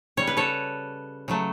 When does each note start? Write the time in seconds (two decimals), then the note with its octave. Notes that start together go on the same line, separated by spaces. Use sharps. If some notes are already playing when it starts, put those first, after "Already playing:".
0.17 C#3 G3 C#5
0.27 B4
0.37 A4 C#5
1.28 C#3 F#3 A3